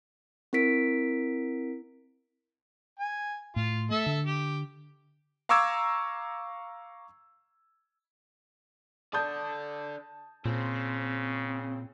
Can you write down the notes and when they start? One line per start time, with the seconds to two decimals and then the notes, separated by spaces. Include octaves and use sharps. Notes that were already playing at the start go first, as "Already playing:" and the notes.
0.53 C4 E4 A#4 B6 D7
3.00 G#5
3.56 A2 F4
3.91 A3 A4 E5
4.06 D3
4.26 G4
5.49 F5 A#5 C#6 D6 E6 G#6
9.13 A4 D5 A5 D#6 G6
10.45 A#2 C#3 C4